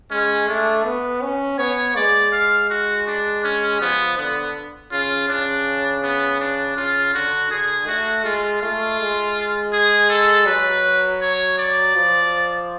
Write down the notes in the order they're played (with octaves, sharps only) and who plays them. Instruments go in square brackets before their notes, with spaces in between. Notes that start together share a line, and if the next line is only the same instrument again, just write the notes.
[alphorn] G#3 [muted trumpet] C#4
[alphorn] A3 [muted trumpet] D4
[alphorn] B3
C#4
[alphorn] B3 [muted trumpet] C#5
[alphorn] G#3 [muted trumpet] D5
[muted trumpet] F5
F#4
D4
C#4
[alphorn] F3 [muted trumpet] B3
[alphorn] D3 [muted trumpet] B3
[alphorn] C#3 [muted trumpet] F4
[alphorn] C#3 [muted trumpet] D4
[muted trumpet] B3
D4
[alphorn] C#3 [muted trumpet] F4
[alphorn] D3 [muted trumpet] F#4
[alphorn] D3 [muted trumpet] G#4
[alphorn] A3 [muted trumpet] F#4
[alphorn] G#3 [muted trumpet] F4
[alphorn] A3 [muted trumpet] F4
[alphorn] G#3
[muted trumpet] G#4
A4
[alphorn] F#3 [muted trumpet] B4
[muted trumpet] C#5
D5
[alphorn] F3